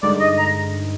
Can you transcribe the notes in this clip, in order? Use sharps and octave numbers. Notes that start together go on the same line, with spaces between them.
G2 D3 G#3 D#4 D5
D#5
A#5